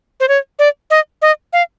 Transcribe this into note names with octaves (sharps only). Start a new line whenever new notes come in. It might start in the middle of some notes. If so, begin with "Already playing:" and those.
C5
C#5
D5
D#5
D#5
F5